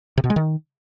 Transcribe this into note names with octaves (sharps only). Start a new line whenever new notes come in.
C3
B2
G#3
D#3